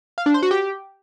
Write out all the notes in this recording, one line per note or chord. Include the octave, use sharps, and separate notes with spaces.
F5
D4
C5
F#4
G4